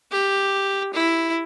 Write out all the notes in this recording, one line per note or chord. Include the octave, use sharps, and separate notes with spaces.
G4
E4